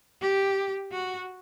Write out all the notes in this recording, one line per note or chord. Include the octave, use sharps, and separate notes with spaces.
G4
F#4